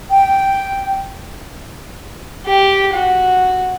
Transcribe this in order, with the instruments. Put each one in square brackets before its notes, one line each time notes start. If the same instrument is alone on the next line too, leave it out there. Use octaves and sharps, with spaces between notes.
[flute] G5
[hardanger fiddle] G4
F#4